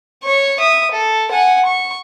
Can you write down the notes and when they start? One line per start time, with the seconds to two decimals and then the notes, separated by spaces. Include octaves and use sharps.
0.24 C#5 C#6
0.60 E5 D#6
0.92 A4
1.32 F#5 G#5
1.66 C#6